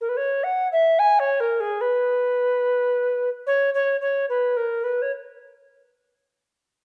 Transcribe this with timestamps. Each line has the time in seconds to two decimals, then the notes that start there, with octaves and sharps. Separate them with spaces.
0.01 A#4
0.09 B4
0.17 C#5
0.43 F#5
0.72 E5
0.99 G#5
1.19 C#5
1.40 A#4
1.60 G#4
1.81 B4
3.46 C#5
3.74 C#5
4.01 C#5
4.29 B4
4.57 A#4
4.83 B4
5.02 C#5